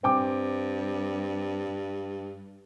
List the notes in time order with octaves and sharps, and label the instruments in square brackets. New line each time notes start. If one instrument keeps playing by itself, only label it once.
[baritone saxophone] G2 [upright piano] C4 G5 D6